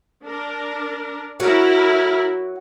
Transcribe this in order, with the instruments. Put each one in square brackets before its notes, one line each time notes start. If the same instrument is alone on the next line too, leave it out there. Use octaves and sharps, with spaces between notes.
[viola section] D4 A#4
[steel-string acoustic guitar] F#3 F#4 F#5 [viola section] E4 A#4